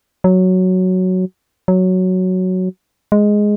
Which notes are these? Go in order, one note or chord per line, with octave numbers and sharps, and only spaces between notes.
F#3
F#3
G#3